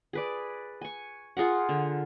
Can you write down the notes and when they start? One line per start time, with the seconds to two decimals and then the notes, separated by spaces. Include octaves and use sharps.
0.13 G#4 B4 D5
0.81 G#5 C#6
1.37 F4 G#4 A#4 F#5
1.69 D3